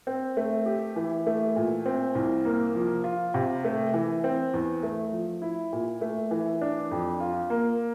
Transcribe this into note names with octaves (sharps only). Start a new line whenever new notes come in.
C4
A3
G4
E3
A3
A#2
C4
C2
A#3
F3
F4
C3
A3
E3
C4
E2
A3
F3
E4
A#2
A3
E3
D4
F2
F4
A#3